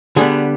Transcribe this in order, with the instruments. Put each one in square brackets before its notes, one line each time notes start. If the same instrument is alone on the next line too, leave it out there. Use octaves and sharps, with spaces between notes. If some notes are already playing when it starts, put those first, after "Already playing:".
[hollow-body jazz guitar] D3 G3 B3 G#4